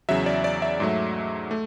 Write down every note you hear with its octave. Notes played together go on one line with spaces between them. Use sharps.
E2 C#3 F#3 E5
D5
D5
E5
G#2 F#3 A3
A3